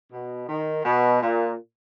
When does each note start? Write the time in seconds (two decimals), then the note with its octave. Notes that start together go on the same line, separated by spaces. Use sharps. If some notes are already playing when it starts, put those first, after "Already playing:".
0.12 B2
0.48 D#3
0.84 B2
1.21 A#2